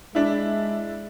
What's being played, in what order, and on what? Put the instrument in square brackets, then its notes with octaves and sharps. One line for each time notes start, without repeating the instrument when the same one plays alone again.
[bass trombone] G#3 [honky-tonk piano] D4 E4